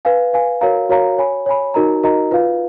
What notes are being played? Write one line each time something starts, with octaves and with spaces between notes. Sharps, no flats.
B4 F5 G#5
B4 F5 G#5
F#4 A#4 C#5 F5 A#5
F#4 A#4 C#5 F5 A#5
C#5 G#5 B5
C#5 G#5 B5
D#4 F#4 A#4 D#5 A#5
D#4 F#4 A#4 D#5 A#5
F4 B4 F5